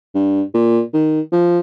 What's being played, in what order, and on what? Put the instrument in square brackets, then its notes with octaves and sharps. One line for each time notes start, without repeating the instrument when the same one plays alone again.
[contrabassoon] G2
A#2
D#3
F3